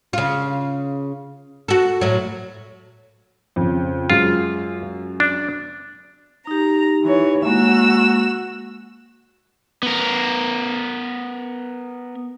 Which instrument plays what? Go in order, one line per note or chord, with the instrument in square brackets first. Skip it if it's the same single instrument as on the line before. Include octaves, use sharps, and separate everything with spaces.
[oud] C#3 F4
F#4 A4
A2 F#3
[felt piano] F2 C#3
[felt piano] F#2 G#3 [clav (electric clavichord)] F4
[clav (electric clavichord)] D4
[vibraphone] D#4 G4 [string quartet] A#5
[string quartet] E3 C#5
[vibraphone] G#3 A#3 [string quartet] F#4 E6
[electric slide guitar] B3 A#4